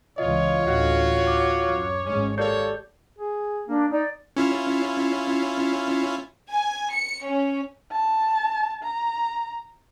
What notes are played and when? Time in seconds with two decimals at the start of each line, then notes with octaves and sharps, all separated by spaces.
0.18 C#2 E3 F4 C#5 D#5
0.66 A1 D2 F4 F#4
1.27 D6
1.66 F#2
2.06 G#1 G#2 G#3 C#4
2.38 A#3 G4 A4 C#5 D5 G6
3.18 G#4
3.68 A#3 D4
3.91 D#4 D5
4.37 C#4 E4 F4
6.50 G#5
6.93 C#7
7.25 C#4
7.91 A5
8.83 A#5